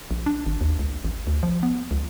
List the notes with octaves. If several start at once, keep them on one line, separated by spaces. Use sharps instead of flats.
A#1
D4
G#1
D#2
C#2
A1
D2
F3
B3
C#2